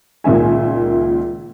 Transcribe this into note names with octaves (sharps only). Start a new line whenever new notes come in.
C#2 A#2 D#3 E5 G#5